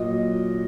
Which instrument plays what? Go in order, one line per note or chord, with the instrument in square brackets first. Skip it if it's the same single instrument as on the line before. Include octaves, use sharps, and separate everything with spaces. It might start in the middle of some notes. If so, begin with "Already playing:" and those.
Already playing: [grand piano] A#2 F#3 D#5